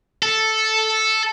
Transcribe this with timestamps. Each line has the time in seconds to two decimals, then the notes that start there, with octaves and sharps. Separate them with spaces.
0.23 A4